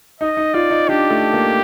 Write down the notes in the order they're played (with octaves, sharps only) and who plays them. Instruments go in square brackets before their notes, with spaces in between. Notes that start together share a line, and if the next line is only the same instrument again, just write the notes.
[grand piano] D#4 [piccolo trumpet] D#5
[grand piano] D#4
[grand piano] F4 [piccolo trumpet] D5
[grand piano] D#4
[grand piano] D4 [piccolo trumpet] G4
[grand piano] A3
A#3